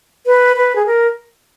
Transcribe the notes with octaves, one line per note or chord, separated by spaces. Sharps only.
B4
B4
G#4
A#4